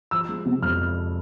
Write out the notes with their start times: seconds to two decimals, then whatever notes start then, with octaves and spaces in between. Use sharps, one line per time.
0.11 F3 E6
0.29 G#3
0.46 C3
0.62 F2 F6